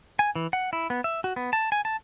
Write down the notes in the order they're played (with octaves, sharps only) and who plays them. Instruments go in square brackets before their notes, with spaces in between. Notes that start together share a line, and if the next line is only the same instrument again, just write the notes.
[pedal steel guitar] G#5
E3
F#5
E4
B3
E5
F#4
B3
A5
G#5
A5